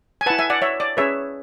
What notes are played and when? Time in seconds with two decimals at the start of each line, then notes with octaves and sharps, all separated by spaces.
0.21 G#5
0.26 B4 F#5 A5
0.30 E4
0.39 E5 G#5
0.50 D5 F#5
0.62 C#5 E5
0.80 D5
0.97 C#4 G#4 B4 C#5 E5